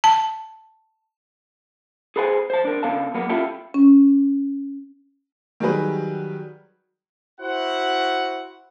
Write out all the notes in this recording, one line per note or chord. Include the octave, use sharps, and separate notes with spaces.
A5
G#4 A4 B4 C5 F#5 G#5
C5 A5
D4 A#4
C#3 B3 A4 D5 F5 A5
F#3 A#3 B3
C#4 E4 F4 G4 A4
C#4
D#3 F#3 G3 G#4 B4
E4 F#4 C5 F#5